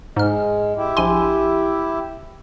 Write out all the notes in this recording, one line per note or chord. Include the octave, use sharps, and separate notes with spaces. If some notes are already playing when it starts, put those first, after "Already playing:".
G#2 G#3 F6
E4 G4
A#1 G#5 C6